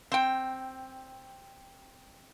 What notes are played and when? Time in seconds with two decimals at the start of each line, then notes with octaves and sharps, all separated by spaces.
0.12 C4 G5